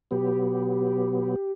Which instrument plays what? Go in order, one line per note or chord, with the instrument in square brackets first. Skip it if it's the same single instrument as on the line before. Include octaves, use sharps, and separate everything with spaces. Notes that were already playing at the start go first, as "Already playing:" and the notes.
[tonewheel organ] B2 F#3 B3 [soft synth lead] G4